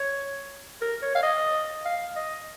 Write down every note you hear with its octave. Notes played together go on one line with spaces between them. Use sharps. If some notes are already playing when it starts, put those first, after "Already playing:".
Already playing: C#5
A#4
C#5
F5
D#5
F5
D#5